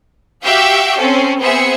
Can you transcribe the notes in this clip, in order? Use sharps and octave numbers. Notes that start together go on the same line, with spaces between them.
F#4 G4 E5 F5 G5
C4 C#4 A4
B3 C4 G#4 C5 E5 C#7